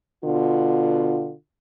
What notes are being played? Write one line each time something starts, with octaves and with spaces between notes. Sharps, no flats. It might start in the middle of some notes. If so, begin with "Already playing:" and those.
B2 D3 F4